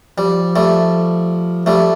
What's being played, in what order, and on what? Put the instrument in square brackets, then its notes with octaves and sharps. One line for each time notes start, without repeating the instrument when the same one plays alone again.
[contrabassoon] F3 [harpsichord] G3
[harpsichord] G3 A3
[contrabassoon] F3 [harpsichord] G3 A3